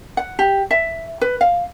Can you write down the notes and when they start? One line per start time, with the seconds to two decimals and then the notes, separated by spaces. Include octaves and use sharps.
0.17 F#5
0.39 G4
0.71 E5
1.21 B4
1.41 F5